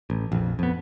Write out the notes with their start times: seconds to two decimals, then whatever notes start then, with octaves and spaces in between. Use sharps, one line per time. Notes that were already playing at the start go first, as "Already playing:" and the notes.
0.10 A1
0.32 A#1 F2
0.59 F2 B3